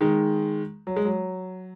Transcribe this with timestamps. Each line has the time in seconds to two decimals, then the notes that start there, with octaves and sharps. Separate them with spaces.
0.01 D#3 G#3
0.87 F#3
0.96 G#3
1.05 F#3